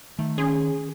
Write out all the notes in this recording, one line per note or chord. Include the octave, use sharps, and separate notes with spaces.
D#3 A3
C#4 G#4 C6